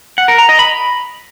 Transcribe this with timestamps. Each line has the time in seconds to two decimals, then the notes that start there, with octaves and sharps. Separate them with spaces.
0.18 F#5
0.28 A#4
0.38 A#5
0.49 D#5
0.59 B5